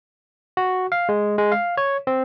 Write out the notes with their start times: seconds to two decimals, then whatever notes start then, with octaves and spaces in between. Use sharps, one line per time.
0.57 F#4
0.92 F5
1.09 G#3
1.38 G#3
1.52 F5
1.77 C#5
2.07 C4